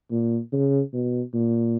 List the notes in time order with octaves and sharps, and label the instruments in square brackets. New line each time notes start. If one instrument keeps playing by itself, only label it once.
[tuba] A#2
C#3
B2
A#2